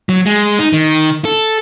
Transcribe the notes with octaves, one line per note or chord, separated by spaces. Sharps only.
F#3
G#3
D#4
D#3
A4